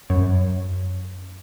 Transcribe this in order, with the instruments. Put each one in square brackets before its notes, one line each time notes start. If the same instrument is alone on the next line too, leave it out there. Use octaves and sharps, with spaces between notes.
[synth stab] F#2